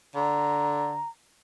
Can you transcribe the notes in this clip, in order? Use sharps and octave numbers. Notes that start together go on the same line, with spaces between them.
D3 A#5